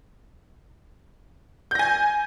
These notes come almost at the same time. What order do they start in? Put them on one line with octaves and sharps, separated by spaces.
G6 A#6 G#5